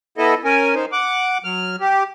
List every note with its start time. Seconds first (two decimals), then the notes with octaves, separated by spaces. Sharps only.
0.18 B3 E4 A4 D#5
0.44 C#4 A#4 G#5
0.75 D#3 D#4 C5
0.92 F#5 D6
1.44 F#3 F6
1.81 G4